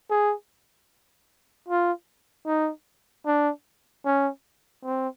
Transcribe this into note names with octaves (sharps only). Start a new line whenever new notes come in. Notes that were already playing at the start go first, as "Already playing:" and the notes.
G#4
F4
D#4
D4
C#4
C4